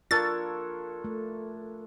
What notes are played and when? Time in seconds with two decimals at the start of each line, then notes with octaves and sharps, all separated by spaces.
0.11 D4 F4 A4 A#4 C#5 A6
1.04 A3